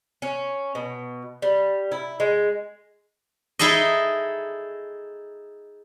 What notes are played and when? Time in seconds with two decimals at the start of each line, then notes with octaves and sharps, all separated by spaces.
0.22 C#4
0.75 B2
1.42 G3
1.92 E4
2.20 G#3
3.59 D#4 E4 G#4 A4 D#5